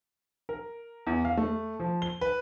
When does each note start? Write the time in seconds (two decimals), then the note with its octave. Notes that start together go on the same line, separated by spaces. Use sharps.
0.49 A#4
1.07 E2
1.25 F5
1.37 A3
1.80 F3
2.02 G7
2.21 B4